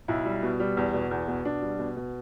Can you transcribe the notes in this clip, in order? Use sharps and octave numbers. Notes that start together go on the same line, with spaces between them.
B1 E4
G3
B2
G3
E2
B2
E2
B2
B2 D4
G3
B2
B2